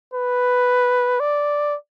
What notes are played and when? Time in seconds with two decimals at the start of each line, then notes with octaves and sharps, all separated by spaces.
0.14 B4
1.20 D5